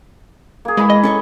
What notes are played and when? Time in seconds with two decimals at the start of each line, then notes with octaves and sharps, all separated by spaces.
0.65 A#3 G#4
0.77 E3 G#3 B5
0.90 D#5
1.03 C#4 A4 C#5